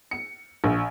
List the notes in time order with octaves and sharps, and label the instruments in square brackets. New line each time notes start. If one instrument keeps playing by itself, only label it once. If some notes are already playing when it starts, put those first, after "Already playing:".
[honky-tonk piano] C#7
A#1